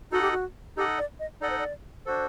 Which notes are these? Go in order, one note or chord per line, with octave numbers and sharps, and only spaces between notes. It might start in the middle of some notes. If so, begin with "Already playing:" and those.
D#4 F#4 A4 D#5 F#5
G4
F#4
D#4 G4 A4 D#5 F#5
D5
D#5
D#4 A4 D5 D#5 F#5
C5
D5
D4 F#4 A4 C5